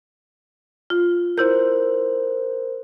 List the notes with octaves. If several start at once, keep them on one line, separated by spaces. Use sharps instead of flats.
F4
E4 A#4 C5 G6